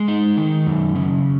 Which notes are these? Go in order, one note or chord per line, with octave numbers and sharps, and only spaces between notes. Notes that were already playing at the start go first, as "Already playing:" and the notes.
Already playing: G#3
D#4
D#3
F#2
C#3